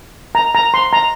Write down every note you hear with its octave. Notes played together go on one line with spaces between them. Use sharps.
A#5
A#5
C6
A#5